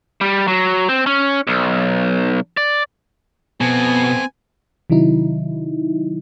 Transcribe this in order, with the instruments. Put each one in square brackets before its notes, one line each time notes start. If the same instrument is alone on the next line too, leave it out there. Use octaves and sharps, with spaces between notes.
[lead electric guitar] G3
F#3
C4
C#4
B1
D5
[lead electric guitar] B2 [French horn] B3 [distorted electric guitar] C4 A4 [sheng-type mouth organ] G#5
[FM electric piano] C3 D#3 F#3 D#4 E4